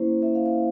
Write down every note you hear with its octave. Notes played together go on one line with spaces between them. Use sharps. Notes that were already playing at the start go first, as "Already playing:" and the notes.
Already playing: A#3 C#4 E4 C5
E5
F5
F5